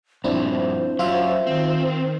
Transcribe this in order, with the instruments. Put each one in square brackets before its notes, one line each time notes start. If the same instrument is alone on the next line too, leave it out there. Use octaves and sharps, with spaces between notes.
[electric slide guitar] G2 A#2 F3 [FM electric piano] C4 D4 E4 [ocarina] C5
[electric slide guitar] F#3 C#4 [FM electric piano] F4 E5
[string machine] D#3 [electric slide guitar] C4